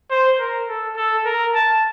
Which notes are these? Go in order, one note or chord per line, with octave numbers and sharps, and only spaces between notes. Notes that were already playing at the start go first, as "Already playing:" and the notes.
C5
A#4
A4
A4
A#4
A5